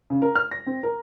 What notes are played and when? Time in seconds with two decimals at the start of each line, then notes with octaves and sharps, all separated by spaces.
0.10 C#3
0.22 A#4
0.35 F6
0.51 A#6
0.67 C4
0.83 A#4